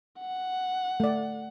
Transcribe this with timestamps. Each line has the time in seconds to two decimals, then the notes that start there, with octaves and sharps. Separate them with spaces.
0.19 F#5
1.00 A3 D5